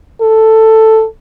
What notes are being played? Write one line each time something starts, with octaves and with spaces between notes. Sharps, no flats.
A4